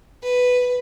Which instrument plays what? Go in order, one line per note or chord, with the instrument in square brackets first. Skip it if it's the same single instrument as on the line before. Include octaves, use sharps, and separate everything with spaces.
[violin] B4